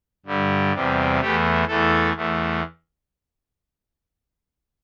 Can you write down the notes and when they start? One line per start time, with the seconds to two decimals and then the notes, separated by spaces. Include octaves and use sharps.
0.26 G2 D3 G3
0.73 E2 C3 G3
1.20 E2 E3 A3 G4
1.67 E2 E3 A3 A4
2.15 E2 E3 A3